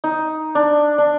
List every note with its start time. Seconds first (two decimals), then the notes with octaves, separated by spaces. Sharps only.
0.04 D#4
0.55 D4
0.98 D4